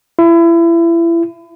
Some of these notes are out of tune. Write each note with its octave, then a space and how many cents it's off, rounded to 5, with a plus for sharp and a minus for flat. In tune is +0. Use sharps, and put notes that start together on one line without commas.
E4 +30